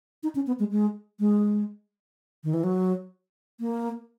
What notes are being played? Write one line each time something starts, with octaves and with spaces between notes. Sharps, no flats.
D#4
C#4
B3
G#3
G#3
G#3
D#3
E3
F#3
A#3